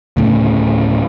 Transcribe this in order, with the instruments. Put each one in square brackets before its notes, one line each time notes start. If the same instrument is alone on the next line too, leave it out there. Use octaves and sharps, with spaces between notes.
[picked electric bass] D2 A2 C#3